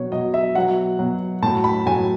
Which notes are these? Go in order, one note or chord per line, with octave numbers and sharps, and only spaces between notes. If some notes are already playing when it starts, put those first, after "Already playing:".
Already playing: B2 F#3 C#5
B2 F#3 D#5
E5
B2 F#3 F#5
B2 F#3
A2 F#3 A5
B5
A2 F#3 G#5